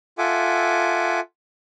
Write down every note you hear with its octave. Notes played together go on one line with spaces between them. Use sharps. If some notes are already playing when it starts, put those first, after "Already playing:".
F4 A4 E5 F#5 G#5 D6